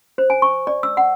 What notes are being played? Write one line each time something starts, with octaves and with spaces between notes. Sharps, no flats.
C5
G#5
C#6
D5
E6
F#5